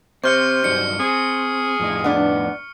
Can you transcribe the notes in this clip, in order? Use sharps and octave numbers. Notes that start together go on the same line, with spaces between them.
C3 C4 C#6 F6 C#7
G2 F#3 D#4 C#7
C4 G#4
F2 A2 D#4
B3 D4 B4